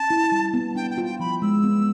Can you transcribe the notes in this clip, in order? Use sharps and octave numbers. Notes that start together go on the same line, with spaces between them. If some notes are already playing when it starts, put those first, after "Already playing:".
Already playing: C#4 A5
E4
G3
B3
D4 G5
G5
F4
G5
F3 B5
G#3 E6
B3